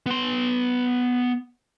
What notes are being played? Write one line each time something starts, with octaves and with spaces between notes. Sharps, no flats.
B3 C6